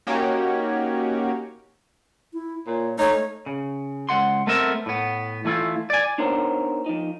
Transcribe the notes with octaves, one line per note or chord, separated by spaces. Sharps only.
A#3 C#4 D#4 F#4 G4 C#5
E4
A#2 C#5
A3 D#4 C#5
C#3
C#2 F#5 C6
A3 B3 C4 A4 A#4 E5
A2 B3
E3 A3 E4 F4
D5 G#5
B3 D4 D#4 A#4 C5 C#5
F3 D#4